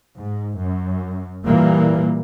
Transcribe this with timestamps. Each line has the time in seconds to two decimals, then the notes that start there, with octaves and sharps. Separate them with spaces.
0.17 G#2
0.58 F#2
1.45 A#2 E3 G3 A#3